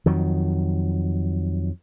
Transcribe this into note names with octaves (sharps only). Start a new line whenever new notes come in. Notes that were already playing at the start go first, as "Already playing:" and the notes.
F2 D#3 F#3